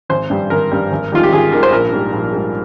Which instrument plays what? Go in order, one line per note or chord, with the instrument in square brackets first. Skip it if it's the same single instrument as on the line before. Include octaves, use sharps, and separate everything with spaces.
[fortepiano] G#1 C5
G2 G3
G#1 A#4
G2 G3
G#1
G#2 D#3 G3 F4
G4
G#1 G#4
G#2 D#3 G3 A#4
C5
A#1 A#4
G#2 G3
A#1
G#2 G3